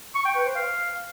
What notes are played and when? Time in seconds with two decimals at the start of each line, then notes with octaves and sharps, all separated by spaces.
0.15 C#6
0.25 G5
0.35 B4
0.45 C5
0.55 F5